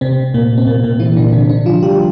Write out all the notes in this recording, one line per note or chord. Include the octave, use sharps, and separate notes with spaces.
C3 C4
A#2 A#3
C4
A#2 A#3
A#2 A#3
E3 E4
D3 D4
C3 C4
D3 D4
F3 F4
G3 G4